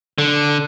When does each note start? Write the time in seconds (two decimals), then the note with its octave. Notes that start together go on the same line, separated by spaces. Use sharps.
0.18 D3